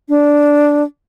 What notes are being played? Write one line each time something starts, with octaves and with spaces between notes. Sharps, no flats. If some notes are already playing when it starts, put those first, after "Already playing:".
D4